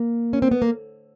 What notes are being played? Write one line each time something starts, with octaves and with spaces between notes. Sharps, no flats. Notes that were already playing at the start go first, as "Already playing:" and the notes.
Already playing: A#3
C#4
C4
B3
A#3